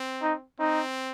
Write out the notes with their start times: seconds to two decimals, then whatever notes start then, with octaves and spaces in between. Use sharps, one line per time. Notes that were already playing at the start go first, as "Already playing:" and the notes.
Already playing: C4
0.23 D#4
0.59 C4 D#4